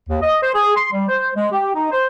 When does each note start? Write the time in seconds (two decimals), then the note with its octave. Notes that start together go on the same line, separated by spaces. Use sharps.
0.09 D#2
0.22 D#5
0.42 C5
0.55 G#4
0.76 C6
0.92 G3
1.09 C5
1.35 G#3
1.52 G4
1.75 D#4
1.92 C5